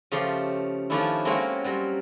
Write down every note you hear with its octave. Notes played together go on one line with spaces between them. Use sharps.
C#3 F3 A3 G4 C6
D#3 F3 A3 C#4 D4 E4
G#3 A#3 C4 C#4 F4 F#4
F#3 G3 A#4